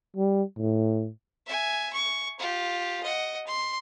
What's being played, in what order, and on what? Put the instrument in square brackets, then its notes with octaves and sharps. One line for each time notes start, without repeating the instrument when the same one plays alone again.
[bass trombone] G3
A2
[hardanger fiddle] E5 G#5
C#6
F4 G4
D#5 F#5
C6